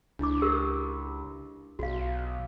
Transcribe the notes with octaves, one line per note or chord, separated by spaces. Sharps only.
C#2 D4 E4 D6
G4 A#4 E6
B1 F#4 F5